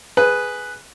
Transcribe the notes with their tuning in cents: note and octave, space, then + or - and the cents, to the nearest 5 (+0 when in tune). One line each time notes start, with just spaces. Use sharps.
G#4 +0 B4 +0